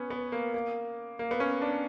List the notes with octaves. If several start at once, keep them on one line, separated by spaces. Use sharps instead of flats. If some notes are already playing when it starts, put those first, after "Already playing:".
Already playing: B3 C#4
B3
A#3
A#3
A#3
B3
C#4
D4